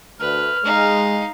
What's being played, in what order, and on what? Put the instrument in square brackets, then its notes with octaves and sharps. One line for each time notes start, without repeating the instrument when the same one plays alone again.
[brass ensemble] D2 [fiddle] B4 [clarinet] F6
[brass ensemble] G#3 [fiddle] D#4 F5